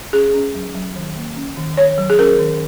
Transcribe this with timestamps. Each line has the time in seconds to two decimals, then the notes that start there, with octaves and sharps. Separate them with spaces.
0.13 C#4 G#4
0.34 C#4
0.55 F#3
0.75 F#3
0.96 D#3
1.16 A#3
1.36 C#4
1.57 D#3
1.77 D#3 C#5
1.98 F#3
2.10 G#4
2.19 C#4 A#4
2.39 D#3